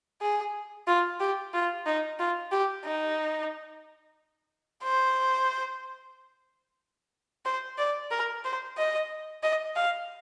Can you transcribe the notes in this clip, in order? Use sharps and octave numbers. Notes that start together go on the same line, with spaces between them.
G#4
F4
G4
F4
D#4
F4
G4
D#4
C5
C5
D5
A#4
C5
D#5
D#5
F5